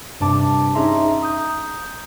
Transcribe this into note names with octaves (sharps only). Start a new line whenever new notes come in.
G2 C3 D4 A5 D6
C#4 D#4 G#4 E5 A#5 C6
A#5 D#6 G6